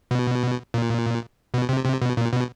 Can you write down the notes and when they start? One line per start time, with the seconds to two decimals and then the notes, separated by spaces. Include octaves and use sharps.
0.11 B2
0.74 A#2
1.54 B2
1.69 C3
1.85 C3
2.02 B2
2.17 A#2
2.32 B2